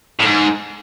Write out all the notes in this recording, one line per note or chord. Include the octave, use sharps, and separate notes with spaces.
A2
G#2